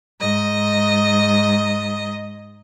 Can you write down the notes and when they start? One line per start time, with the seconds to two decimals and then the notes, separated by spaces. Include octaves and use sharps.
0.20 G#2 D#5